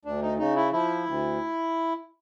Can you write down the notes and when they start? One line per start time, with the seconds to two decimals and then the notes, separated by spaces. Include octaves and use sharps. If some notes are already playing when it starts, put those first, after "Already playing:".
0.05 D2 D4
0.22 D#4
0.38 C#3 D#4
0.56 E4
0.72 F3 E4
1.06 D2